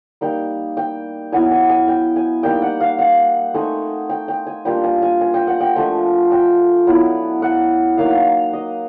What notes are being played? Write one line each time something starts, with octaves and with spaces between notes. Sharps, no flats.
G3 A#3 D#4 G5
G5
F#3 B3 E4 G#5
G#5
G#5
G5
G#5
G3 A#3 D#4 G5
F#5
F5
F#5
A3 C4 D#4 G#5
G5
G5
G#5
G3 A#3 D4 F4 G5
G#5
G#5
G#5
G5
F#5
G5
F3 A3 D4 G#5
G5
F#3 B3 E4
F#5
F#3 A#3 D#4 F5
D#5